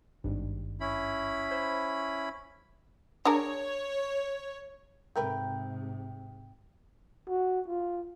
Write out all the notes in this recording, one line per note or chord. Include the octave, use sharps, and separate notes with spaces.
G#1 G2
C#4 E4 B5
C5
D4 G#4 A#4 C#5
G#2 C3 A3 A#4 B4 G5
F#4
F4